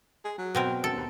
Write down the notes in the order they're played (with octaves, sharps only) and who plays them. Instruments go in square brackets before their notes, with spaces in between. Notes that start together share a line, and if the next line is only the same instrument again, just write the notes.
[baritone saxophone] G#4
F#3
[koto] B2 C4 A#4
[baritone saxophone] F#2 [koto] A4
[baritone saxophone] D#2